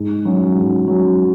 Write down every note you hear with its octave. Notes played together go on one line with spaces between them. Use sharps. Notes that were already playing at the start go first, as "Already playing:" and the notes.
Already playing: G#2
F#3 C#4 F#4
G#2
F#3 C#4 F#4